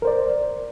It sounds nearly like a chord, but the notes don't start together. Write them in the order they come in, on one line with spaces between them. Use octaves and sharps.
A#4 C5 D5